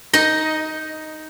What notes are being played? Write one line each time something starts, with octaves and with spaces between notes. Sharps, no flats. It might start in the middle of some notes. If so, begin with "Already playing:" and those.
D#4 D#5